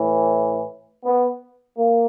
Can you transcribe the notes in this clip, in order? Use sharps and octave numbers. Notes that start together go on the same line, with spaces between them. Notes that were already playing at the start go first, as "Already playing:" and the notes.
Already playing: A2 E3
B3
A#3